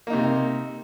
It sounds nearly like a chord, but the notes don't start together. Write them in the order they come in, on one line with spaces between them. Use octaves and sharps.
A#3 D#4 C3